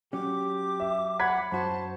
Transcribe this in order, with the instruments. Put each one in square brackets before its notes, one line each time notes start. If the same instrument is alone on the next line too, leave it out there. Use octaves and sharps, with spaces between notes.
[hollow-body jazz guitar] F#3 C#4 [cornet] G4 [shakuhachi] D6
[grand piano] E5
[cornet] F#5 [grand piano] B5 G#6 B6
[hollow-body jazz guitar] F#2 F#4 [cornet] C5 [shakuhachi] A5